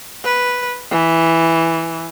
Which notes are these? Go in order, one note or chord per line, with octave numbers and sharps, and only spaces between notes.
B4
E3